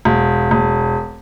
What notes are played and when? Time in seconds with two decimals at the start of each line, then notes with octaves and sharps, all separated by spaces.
0.05 E1
0.51 E1